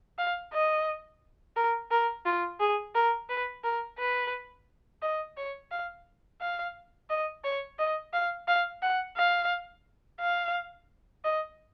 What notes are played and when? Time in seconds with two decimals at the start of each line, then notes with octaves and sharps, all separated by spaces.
0.18 F5
0.53 D#5
1.56 A#4
1.91 A#4
2.26 F4
2.60 G#4
2.95 A#4
3.29 B4
3.64 A#4
3.98 B4
5.02 D#5
5.37 C#5
5.71 F5
6.41 F5
7.10 D#5
7.44 C#5
7.79 D#5
8.13 F5
8.48 F5
8.82 F#5
9.17 F5
10.20 F5
11.24 D#5